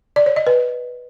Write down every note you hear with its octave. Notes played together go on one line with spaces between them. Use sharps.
D5
C#5
D#5
B4